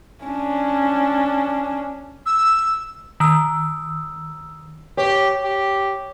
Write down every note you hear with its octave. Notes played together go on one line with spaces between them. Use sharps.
C#4 D4
E6
D#3 E6
G4 C#5
G4